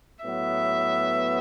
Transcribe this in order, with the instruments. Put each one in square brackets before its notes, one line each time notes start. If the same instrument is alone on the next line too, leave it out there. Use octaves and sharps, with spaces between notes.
[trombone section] A2 F#3 B3 [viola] E5